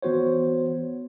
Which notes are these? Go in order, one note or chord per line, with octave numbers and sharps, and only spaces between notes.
E3 B3 F#4 C5 C#5